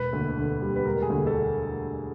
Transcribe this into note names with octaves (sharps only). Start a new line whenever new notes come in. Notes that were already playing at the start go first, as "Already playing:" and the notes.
Already playing: E1 B4
D2
D3
G3
B4
E1 A#4
G#4
D2
A4